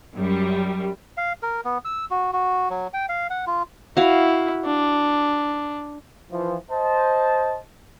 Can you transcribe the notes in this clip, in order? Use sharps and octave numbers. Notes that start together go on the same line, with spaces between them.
F#2 G3
F5
A#4
B3
E6
F#4
F#4
F#3
G5
F5
F#5
F4
E4 F#4 F5
D4
E3 F3
C5 D#5 A5